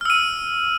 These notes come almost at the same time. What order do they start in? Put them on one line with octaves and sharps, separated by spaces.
F6 E6 D#7